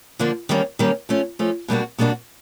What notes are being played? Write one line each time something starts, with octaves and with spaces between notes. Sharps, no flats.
D3 F3 A#3 D4
D#3 G3 A#3 C#4
D#3 G3 A#3 C#4
F3 A3 C#4
F3 A3 C#4
B2 G3 A#3 D4 F#4
B2 G3 A#3 D4 F#4